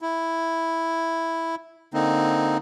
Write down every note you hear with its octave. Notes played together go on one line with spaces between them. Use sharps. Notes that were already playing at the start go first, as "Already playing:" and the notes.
E4
D3 A#3 C4 D#4